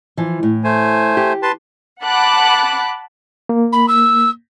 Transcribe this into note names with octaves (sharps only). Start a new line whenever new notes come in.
E3 F3
A2
A3 C5 G#5
G4
B4 A5 C6
F#5 A5 B5 D6 F#6
A#3
B5
E6